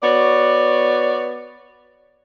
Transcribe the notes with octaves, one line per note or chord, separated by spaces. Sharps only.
B3 F#4 C#5 D5